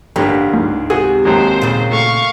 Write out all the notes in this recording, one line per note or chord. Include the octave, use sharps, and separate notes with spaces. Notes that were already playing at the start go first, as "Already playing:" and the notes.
A1 G2 D3 A#3 G4 A#4
C#2 G#2
C3 F#4 G#4
D#2 D#3 F#3 G#3 C5
A#2 C#3
A3 F5 C#6